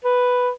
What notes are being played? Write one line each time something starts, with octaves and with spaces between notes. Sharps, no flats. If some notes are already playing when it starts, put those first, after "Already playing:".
B4